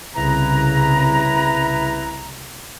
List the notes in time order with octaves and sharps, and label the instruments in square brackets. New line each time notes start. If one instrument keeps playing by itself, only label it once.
[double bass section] C2 C#3 [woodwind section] E4 B4 A#5